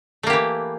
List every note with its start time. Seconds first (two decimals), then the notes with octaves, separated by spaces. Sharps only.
0.23 A3
0.27 A#3
0.30 G4
0.33 E3